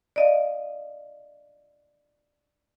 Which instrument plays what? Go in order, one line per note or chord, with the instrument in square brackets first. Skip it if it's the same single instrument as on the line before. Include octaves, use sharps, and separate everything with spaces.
[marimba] D5 D#5 F5